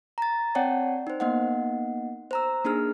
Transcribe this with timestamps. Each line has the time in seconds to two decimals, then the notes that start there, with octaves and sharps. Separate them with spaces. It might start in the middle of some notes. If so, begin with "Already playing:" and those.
0.18 A#5 A6
0.55 C4 C#5 D5 F#5 G5 A5
1.07 D#4 C5
1.20 A#3 B3 D#4 D#5 F#5
2.31 C5 A#5 E6
2.65 A#3 D4 D#4 G#4 F6